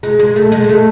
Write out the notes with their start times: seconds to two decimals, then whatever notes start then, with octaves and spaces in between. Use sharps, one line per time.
0.03 G#3
0.19 G#3
0.36 A3
0.52 G#3
0.64 G#3
0.69 A3